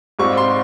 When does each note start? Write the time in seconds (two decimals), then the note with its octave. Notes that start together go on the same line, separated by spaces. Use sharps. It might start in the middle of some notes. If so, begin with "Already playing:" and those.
0.19 G#2 G3 C4 F4 C#6
0.37 C6